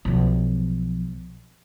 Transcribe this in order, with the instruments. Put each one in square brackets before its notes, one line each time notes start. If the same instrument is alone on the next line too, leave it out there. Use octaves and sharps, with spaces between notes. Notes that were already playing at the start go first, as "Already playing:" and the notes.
[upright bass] B1 F3